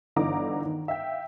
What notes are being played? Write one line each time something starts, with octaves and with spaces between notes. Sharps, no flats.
G1 D3 E3 D#4 A#5 D6
D#3
E5 F5 G5